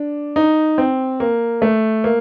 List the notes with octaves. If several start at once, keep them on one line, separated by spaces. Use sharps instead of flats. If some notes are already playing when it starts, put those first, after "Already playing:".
Already playing: D4
D#4
C4
A#3
A3
A#3